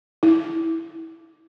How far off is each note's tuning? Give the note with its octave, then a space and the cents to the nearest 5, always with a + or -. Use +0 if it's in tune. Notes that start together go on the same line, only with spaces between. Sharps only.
E4 -15